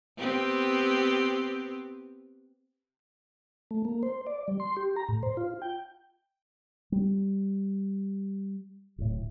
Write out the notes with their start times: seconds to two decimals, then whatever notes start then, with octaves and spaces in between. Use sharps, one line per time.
0.18 B3 C4 G4
3.71 A3
3.85 A#3
4.03 C5
4.27 D5
4.48 G3
4.60 C6
4.77 G4
4.96 A#5
5.09 A2
5.23 C5
5.37 F4
5.62 G5
6.92 G3
8.98 D1 A2